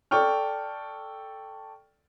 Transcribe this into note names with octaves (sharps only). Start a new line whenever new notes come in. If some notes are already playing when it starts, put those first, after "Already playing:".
A4 D5 G5 C#6 F6